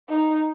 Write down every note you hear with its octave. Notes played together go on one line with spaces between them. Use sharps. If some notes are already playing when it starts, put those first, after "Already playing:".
D#4